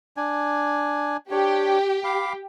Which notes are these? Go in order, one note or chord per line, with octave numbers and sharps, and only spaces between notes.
D4 G#5
D4 G4 C#5
F5 B5 D6